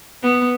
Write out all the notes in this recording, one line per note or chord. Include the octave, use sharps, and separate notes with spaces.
B3